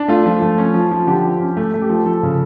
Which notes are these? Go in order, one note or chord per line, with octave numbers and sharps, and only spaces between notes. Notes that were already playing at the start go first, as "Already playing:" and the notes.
Already playing: D4
A3 F4
F3
A3
C#4
F3
F3
D3 G4
F3
C#4
A3
A3
G4
F3
F3 A4
C#3